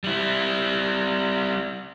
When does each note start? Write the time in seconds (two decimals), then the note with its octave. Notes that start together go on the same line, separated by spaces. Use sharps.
0.04 G3 E4